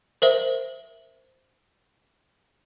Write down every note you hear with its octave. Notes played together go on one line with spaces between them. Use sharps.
A#4 C5 E5